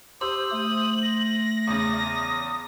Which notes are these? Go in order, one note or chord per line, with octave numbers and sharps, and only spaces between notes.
G4 C5 D#6 E6 F#7
A3 D#6
A#6
E2 C#3 D#6